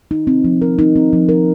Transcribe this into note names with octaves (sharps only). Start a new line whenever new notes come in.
D#4
C4
F3
A#4
D#4
C4
F3
A#4